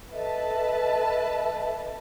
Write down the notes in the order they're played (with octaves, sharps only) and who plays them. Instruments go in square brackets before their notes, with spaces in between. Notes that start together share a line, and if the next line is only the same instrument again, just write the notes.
[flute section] A4 D#5 E5 [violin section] B4 A5